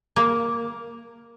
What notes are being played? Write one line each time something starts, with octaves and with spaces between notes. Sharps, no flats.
A#3